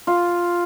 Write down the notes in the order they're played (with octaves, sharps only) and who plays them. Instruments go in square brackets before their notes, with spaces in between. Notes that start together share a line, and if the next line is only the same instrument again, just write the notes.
[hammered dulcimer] F4